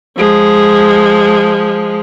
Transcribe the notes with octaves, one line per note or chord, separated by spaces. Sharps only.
F3 G#3